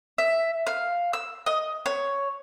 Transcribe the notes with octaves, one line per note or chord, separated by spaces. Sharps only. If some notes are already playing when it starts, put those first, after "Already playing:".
E5
F5
E6
D#5
C#5